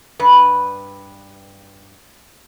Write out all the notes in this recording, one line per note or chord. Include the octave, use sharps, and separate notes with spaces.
G2 B4